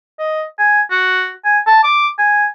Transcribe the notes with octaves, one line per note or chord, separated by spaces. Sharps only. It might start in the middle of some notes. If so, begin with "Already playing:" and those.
D#5
G#5
F#4
G#5
A5
D6
G#5